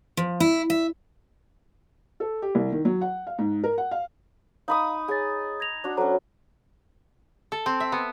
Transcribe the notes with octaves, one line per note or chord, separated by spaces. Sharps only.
F3
E4
E5
A4
G4
C2
D#3
F#3
F#5
F5
G#2
A#4
F#5
F5
D#4 F5 B5 D#6
G#4 C#5 G#5 A6
G#6 A#6 F7
D4 F#4
F#3 C#4 A4 C5 A#5
A4
C4
E5
B3